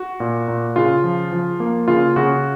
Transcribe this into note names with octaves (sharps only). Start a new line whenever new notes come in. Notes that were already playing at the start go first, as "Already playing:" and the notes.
Already playing: F#4
A#2
A#2
C#3 F4
F3
F3
A#3
C#3 F4
C#3 F#4